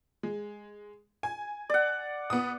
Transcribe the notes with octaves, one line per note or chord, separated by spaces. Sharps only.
G#3
G#5
D5 F#5
B3 D#6